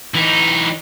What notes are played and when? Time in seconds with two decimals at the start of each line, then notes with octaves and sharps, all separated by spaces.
0.14 E3 D#4